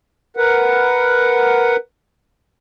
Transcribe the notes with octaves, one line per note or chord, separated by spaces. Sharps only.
A#4 B4 F#5